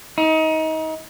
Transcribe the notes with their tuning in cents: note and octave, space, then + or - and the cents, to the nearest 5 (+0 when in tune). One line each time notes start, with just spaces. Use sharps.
D#4 +30